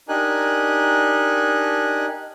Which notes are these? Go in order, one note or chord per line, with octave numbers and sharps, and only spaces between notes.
D4 D#4 G4 A#4 G#5 F#6